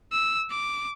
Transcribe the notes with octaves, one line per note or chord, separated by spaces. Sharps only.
E6
D6